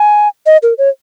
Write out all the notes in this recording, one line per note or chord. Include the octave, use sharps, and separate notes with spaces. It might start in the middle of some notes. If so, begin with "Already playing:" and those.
Already playing: G#5
D#5
A#4
C#5